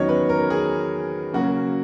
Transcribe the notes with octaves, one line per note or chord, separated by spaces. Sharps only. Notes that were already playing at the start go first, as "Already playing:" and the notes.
Already playing: E2 D#3 F#3 C#4 C#5 D#5
B4
A#4
G#4
C#3 F#3 A#3 C#4 F#4